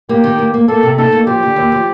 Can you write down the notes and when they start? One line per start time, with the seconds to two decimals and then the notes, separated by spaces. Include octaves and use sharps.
0.09 A#3 G4
0.24 D#3
0.38 A#3
0.54 A#3
0.68 A#3 A4
0.83 C3
0.98 D#4 A4
1.12 A#3
1.27 F3 G4
1.43 D3
1.56 D#2
1.72 F3